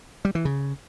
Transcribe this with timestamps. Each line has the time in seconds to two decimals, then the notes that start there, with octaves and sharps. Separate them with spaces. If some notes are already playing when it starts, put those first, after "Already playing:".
0.25 G3
0.35 E3
0.45 C#3